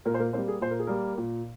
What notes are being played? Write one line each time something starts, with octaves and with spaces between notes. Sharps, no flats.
A#2 A#3 A#4
C5
A#3 A#4
G3 A#3 C4 C5
G#4
A#2 C5
A#4
G#4
G3 A#3 A#4
A#2